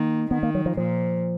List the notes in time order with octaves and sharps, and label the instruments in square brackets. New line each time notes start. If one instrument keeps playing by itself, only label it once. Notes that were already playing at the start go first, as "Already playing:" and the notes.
Already playing: [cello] D#3 [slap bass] A#3
[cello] D#3 [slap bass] B3
[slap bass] A#3
F#3
F3
[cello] A#2 [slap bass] F3